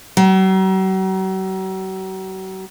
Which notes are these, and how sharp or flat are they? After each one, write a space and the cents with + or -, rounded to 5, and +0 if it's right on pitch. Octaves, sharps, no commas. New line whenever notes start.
F#3 +40